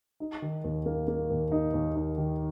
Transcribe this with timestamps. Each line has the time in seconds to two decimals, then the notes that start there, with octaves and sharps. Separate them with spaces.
0.20 D#4
0.42 D#3
0.64 D#2
0.86 A#3
1.08 A#3
1.30 D#2
1.52 D#4
1.74 D#2
1.96 D#4
2.18 D#3